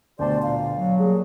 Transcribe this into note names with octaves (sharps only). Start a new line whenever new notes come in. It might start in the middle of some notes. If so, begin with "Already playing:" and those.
D2 B2 G4 C5 D5 A5
A#2 F5
F#3
G3 A#3 G#4